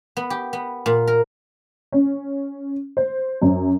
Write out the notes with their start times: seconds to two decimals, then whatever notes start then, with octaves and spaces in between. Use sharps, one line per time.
0.17 B3
0.30 G4
0.53 B3
0.86 A#2
1.07 A#4
1.92 C#4
2.97 C5
3.42 F#2